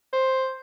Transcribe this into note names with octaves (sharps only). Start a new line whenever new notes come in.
C5